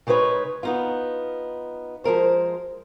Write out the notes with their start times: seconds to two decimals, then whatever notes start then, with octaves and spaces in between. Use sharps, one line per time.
0.07 C#3 G#3 D#4 B4 C#5
0.63 B3 D#4 F4
2.04 F3 G#3 A#4 C5